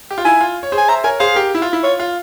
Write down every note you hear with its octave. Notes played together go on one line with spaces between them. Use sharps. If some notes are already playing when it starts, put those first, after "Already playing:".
G4
F4
E4 G#5
F4
C#5
G#4 C5
G#5
C5 E5 A#5
A#4 C#5 G#5
G#4 C5 F5
G4 A#4
E4
F4
E4
F4 C#5
F4